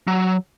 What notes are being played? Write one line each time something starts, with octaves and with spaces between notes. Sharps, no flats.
F#3